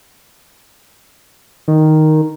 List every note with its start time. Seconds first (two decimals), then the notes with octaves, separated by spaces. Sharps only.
1.68 D#3